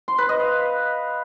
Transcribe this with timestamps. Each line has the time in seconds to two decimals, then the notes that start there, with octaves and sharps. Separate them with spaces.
0.08 C6
0.18 B4
0.29 D#5
0.39 F5